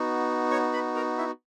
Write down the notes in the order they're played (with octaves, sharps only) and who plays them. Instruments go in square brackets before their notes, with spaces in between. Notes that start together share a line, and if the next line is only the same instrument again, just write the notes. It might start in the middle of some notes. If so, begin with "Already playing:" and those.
Already playing: [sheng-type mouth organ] B3 D#4 F#4
C#5 C#6
B4 B5
A#4 A#5
E4 E5